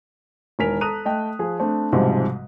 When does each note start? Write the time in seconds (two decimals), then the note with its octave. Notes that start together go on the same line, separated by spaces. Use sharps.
0.59 E1 D#3 A#4 G#5 B6 F7
0.81 A4 A#5 D#6 F#6 D#7 F7
1.05 A3 D#5 G5
1.39 F3 G#4
1.59 A3 C4 D4
1.92 B1 G#2 C3 F3 G3 G#3